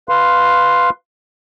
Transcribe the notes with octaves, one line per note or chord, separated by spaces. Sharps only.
B4 F5 C6